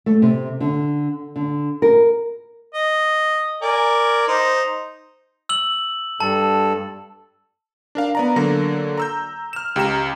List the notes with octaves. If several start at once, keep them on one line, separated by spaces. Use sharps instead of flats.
A3
C3
D3
D3
A#4
D#5
A#4 D5 G#5
D#4 C5
E6 F#7
G2 A4 A5
D4 A#4 F5
B3 D5 A#5
D3 F#3 A#3 A#6
A#5 E6 G6
F6 E7
C#2 G4 A#5 E7